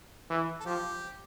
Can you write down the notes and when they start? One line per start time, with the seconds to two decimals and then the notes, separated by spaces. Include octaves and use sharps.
0.30 E3
0.60 A4
0.66 F3 G4